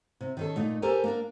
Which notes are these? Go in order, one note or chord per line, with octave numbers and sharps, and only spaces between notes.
C3
D#3 C#4 A4
A#2 A3 D#4
G4 A4 A#4 C5 G#5
A#3 D4 A#4